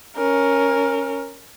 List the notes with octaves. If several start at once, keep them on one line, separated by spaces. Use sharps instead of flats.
C#4 A#4